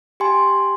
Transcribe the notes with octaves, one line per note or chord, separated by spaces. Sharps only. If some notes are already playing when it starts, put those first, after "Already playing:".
G4 G#5 C6